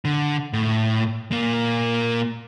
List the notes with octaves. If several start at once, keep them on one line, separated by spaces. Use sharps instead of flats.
D3
A2
A#2 A#3